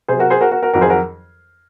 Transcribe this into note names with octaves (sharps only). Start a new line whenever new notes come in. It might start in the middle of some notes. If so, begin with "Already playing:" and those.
C3 F#3 G#4 C5
F#4 A#4
G#4 C5
F#4 A#4
F#4 A#4
F#4 A#4
F2 D#3 F#3 F#4 A#4
G#4 C5
F#4 A#4